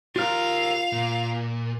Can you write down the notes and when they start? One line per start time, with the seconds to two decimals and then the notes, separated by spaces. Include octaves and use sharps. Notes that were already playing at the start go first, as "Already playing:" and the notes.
0.16 F4 G4 A#4 F5 F6
0.92 A#2